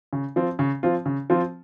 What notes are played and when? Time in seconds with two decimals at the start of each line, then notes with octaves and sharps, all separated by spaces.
0.13 C#3
0.36 F3 C4 F4
0.59 C#3
0.83 F3 C4 F4
1.06 C#3
1.30 F3 C4 F4